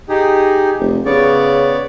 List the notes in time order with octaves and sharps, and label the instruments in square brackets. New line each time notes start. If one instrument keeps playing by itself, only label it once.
[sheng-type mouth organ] D#4 G4 G#4
[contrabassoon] F1
[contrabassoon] C#3 [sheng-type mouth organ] B3 C#5 D5